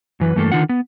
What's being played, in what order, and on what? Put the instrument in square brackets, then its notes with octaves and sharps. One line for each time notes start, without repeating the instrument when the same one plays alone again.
[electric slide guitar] F#2 E3 B4
G2 E3 A3 A#3 A4
D3 D#3 D#4 F4 F#5
B3